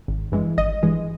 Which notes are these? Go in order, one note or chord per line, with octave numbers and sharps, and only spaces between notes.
G#1
G2 E3 G#3
G#1 D#5
G2 E3 G#3